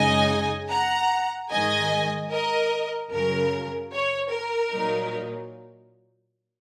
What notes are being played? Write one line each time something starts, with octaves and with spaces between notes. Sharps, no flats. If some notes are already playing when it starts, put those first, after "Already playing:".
Already playing: F#2 C#3 G#3 D#4 D#5 G#5
F#5 A#5
G#2 D#3 G#3 D#5 G#5
A#4 D#5
F#2 C#3 F#3 A#4
C#5
A#4
A#2 F#3 D#4